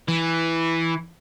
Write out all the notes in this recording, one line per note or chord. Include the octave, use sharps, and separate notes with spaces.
E3